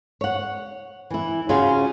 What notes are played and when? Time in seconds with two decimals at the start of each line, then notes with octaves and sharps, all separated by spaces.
0.21 C#5 F#5
1.10 E3 E4
1.49 C#3 C#4 F4 F#4 G#4